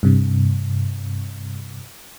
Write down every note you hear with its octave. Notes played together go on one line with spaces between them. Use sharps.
G2 C3